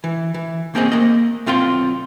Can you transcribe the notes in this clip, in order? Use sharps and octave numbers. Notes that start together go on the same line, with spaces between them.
E3
E3
A#3 C4 C#4 G#4 D#5
A#3 D#5
B1 C4 F4 G5 C6